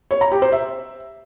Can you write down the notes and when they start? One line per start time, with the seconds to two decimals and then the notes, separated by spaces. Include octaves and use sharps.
0.11 C#5
0.21 A#5
0.32 G4
0.42 C5
0.52 E5